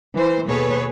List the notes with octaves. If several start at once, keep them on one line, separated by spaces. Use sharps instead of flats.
E3 C5
D#2 B2 G#4 A4 B4 C#5